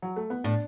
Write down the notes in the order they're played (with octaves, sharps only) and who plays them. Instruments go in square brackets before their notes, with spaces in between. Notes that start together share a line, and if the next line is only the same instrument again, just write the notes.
[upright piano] F#3
A3
B3
[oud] A2 [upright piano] D4